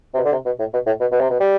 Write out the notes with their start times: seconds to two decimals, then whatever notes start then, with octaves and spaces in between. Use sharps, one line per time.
0.14 C3
0.17 B2
0.25 D3
0.31 C3
0.45 B2
0.59 A2
0.73 B2
0.86 A2
1.00 B2
1.11 B2
1.20 C3
1.30 B2
1.40 G3